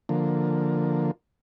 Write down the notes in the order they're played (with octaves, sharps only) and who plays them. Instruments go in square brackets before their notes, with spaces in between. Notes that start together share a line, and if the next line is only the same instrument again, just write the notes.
[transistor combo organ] D3 F3 A#3